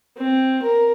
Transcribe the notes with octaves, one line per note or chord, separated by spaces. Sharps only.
C4
A#4